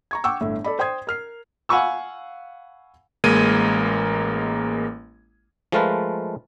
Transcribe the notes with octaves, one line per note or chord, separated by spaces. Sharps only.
A#5 C#6 G#6
F#5 G5 C#6 D6 E6
G1 A2 E5
A4 D5 B5
C5 G5 C6 D#6 G#6
A#4 F6 C7
F5 F#5 G#5 B5 C#6 E6
A1 G#3 A#3 G#6 D#7
F3 G#3 A3 F4 A#4 B4